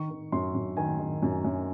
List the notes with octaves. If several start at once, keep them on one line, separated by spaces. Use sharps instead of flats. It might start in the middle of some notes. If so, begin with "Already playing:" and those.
Already playing: D#3 C#6
D#3
F#2 C6
F#2
D#3 G#5
D#3
F#2
F#2